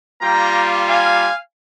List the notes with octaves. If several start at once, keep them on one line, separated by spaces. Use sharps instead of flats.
G3 A#3 F4 G5 A#5
F5 G#5